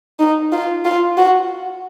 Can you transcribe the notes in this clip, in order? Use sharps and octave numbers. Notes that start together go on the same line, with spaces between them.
D#4
F4
F4
F#4